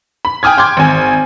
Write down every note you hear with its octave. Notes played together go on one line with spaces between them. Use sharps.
B5
G5 G#5 D#6 F6 G#6
G5 C6 D6 G#6
G#1 G#5